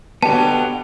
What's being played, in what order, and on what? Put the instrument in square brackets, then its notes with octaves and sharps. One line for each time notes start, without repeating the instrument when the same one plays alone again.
[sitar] B2 D3 F#3 [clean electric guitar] B3 G4 [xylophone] A5